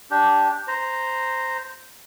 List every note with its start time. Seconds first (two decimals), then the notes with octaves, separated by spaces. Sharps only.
0.11 D4 G4
0.68 C5 A#5